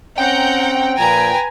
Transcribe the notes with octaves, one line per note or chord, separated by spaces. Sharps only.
C4 C#4 F#5 G5 A#5 G6
A#2 F3 B4 G#5 A#5